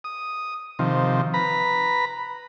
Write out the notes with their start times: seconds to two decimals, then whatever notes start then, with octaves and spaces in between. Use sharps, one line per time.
0.04 D#6
0.79 C3 D#3 F3
1.34 B4 A#5 B5